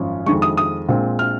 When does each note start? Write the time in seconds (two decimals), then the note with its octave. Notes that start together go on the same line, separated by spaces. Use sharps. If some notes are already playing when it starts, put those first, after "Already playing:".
Already playing: G#1 F#2 F3 C#4
0.26 F2 D#3 G#3 C#6
0.42 D#6
0.57 D#6
0.88 A#1 A#2 G#3 C4
1.19 F6